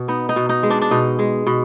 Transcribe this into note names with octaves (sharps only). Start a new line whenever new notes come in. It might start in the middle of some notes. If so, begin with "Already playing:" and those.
Already playing: B2
B3 D#4
D#4
B2
D#4
G#3
D4
D4
B2 D#4
G#3
B2